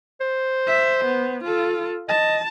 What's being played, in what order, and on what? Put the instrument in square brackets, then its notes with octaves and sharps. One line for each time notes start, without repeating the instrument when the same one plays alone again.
[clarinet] C5
[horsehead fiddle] E5
B3
F4 A4
[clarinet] D#5 [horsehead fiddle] A5